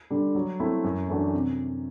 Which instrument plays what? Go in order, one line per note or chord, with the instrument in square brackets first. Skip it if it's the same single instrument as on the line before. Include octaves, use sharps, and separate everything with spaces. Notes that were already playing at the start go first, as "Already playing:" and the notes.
[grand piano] D3 G3
F#3
A3 C4 E4
F#2
E3 A3 D4 F#4
C3